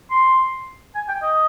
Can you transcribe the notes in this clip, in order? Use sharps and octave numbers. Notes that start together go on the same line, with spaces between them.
C6
G#5
G5
D#5